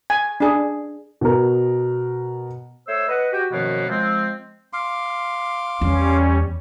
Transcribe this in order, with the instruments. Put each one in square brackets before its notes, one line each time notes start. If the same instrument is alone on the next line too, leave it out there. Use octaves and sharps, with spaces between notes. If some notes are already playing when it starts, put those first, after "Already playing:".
[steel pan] G#5
D4 G#4
[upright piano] B2 A#4
[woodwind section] A3 C5 C#5 E6
B4 D#5 F#5
F#4 G4 G5
F#2 B2 D#3 F3 A#3 B3
F3 G#3 C4
[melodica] F5 C6 D6
[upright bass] E2 [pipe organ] G3 C#4